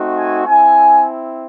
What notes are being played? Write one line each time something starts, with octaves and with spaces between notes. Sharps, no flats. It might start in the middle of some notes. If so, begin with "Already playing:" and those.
Already playing: A3 C4 D#4 F#4
G#5
C4 E4 G#5